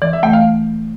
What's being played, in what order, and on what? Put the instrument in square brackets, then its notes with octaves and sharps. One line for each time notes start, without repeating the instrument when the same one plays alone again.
[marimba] E3 [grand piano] D5
[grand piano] E5
[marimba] A3 [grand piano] G5
[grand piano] F5